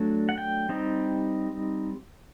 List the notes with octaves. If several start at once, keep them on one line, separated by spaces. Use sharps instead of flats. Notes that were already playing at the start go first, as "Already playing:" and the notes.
Already playing: F#3 A3 D4
F#5
G5
G3 C4 D#4